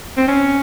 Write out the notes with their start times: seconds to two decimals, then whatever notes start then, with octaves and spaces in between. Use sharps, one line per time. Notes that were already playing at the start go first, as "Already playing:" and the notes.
0.17 C4
0.27 C#4